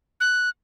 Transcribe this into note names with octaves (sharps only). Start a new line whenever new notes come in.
F#6